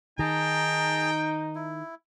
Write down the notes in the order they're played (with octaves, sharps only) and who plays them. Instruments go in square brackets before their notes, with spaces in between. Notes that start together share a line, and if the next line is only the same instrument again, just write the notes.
[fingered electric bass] D#3 [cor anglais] D#4 [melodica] G#4 A5 A#5 [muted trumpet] G5
[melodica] E4